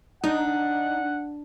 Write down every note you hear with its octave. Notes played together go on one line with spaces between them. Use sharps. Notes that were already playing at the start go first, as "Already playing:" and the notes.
D4 D#4 F#5